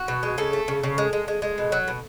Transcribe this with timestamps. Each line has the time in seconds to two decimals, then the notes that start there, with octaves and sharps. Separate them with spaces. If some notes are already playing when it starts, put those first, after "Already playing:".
Already playing: F#4
0.08 B2
0.23 G#3
0.38 C#3 A4
0.53 A3
0.68 C#3
0.83 C#3
0.98 G#3
1.13 G#3
1.28 G#3
1.42 G#3
1.58 B2
1.72 F#3
1.88 B2